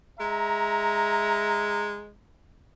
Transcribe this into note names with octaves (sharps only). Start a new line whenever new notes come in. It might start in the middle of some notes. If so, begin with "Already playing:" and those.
G#3 E5 A#5